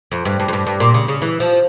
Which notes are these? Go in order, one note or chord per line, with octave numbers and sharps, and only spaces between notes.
F2
G2
G2
F2
G2
G2
A#2
C#3
C#3
E3
F3